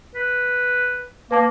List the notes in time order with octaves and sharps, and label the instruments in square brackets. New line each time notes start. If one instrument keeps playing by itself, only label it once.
[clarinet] B4
[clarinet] A#3 [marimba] B4 A5 D6